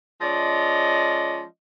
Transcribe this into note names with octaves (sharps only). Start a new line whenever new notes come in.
F3 G#3 C#4 D5 D#5